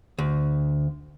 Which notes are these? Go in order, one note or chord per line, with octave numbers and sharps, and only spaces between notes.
D2